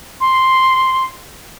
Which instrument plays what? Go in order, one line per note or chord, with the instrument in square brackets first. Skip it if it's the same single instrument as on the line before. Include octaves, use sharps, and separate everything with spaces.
[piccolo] C6